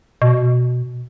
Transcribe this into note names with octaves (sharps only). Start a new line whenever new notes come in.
B2